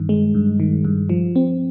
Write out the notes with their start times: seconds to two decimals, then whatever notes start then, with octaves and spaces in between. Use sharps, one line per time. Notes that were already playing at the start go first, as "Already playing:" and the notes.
Already playing: G2 D#3
0.09 G#3
0.34 G2
0.60 D#3
0.85 G2
1.09 F3
1.36 C4